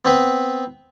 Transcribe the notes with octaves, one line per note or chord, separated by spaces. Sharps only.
B3 C4 B4